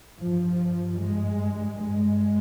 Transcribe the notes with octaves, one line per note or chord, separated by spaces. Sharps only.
G2 F3
G#3
G#3